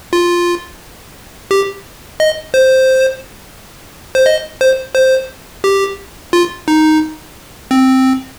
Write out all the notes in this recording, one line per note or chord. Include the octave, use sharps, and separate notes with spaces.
F4
G4
D#5
C5
C5
D#5
C5
C5
G4
F4
D#4
C4